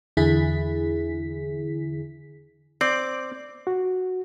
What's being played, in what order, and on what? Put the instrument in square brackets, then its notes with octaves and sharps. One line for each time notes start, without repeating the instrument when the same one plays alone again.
[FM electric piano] E2 D3 E4 G#4 B6
[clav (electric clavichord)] C4 [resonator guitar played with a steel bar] D5
[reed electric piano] F#4